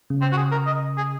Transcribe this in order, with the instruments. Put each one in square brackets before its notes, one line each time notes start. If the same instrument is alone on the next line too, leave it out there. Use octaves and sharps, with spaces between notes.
[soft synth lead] C#3
[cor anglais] C4
F#4
G#4
A#4
D#5
G#4